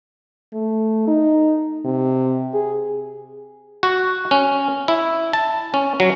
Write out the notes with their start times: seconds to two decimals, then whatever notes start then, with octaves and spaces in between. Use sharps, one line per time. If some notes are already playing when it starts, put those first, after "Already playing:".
0.54 A3
1.08 D#4
1.85 C3
2.54 G#4
3.83 F#4
4.31 C#4
4.88 E4
5.33 A5
5.74 C#4
6.00 F#3